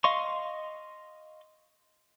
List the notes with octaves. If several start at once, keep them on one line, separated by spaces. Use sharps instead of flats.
D#5 F5 C6 C#6